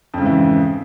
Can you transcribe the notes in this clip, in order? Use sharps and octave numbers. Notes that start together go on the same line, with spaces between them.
F2 G#2 C#3 E3